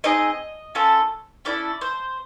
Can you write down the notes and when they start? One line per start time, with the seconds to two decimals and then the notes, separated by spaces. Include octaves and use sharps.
0.04 C4 D#4 G#4 D#5
0.75 C#4 F4 A4
1.45 C#4 E4 A4 D5
1.81 C5